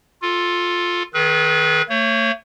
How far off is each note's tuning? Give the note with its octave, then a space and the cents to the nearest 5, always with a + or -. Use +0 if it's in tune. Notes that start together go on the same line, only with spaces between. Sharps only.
F4 +10 A4 +0
D#3 +0 G#4 +45 B4 -25
A3 +40 C#5 -20